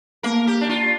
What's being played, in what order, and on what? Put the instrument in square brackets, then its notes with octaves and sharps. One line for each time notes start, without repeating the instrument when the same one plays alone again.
[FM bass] A#3 [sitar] A#4
[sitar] G4
D4
F4